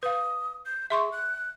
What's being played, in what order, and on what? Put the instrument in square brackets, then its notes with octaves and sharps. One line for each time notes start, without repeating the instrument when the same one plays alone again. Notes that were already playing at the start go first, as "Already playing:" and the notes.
[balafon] B4 F5 [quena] D#6
[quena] G6
[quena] G#4 [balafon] E5 C6 C#6
[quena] F#6